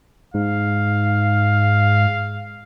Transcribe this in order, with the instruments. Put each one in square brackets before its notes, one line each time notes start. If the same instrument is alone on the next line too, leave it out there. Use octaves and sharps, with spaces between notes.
[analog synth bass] G#2 [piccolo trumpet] F5